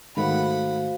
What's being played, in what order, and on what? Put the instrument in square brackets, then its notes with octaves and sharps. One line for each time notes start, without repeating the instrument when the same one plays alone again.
[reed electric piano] G#2 D#3 A3 [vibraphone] F#4 C5 F5 [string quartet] F#5 B5